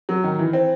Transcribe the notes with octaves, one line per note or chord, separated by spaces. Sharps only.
F#3
D#3
E3
C4